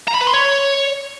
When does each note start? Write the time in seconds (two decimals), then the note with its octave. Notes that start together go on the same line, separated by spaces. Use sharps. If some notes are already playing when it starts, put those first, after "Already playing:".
0.08 A#5
0.14 B5
0.21 B4
0.27 C6
0.34 C#5